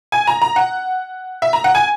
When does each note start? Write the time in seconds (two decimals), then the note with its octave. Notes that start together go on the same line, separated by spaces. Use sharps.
0.12 G#5
0.27 A#5
0.42 A#5
0.56 F#5
1.42 E5
1.53 A#5
1.64 F#5
1.75 G#5